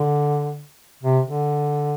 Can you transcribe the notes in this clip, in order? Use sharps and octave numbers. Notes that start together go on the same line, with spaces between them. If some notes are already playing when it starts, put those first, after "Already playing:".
Already playing: D3
C3
D3